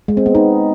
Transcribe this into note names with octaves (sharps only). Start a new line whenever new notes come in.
G#3
C4
B3
D#4